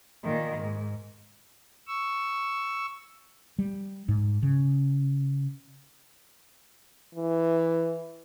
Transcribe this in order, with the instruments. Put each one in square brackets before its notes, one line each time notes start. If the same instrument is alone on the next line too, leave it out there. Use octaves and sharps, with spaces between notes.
[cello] A#2 D#3
G#2
[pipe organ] C#6 E6
[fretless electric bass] G3
G#2
C#3
[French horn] E3